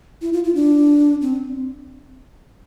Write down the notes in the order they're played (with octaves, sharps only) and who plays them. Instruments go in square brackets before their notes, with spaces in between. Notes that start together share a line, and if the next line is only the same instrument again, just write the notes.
[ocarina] E4
F4
F4
D4
C4